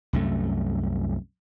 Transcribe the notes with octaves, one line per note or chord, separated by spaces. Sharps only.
C2 F#2 A3